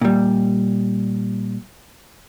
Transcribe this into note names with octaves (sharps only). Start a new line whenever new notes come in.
A#2 G3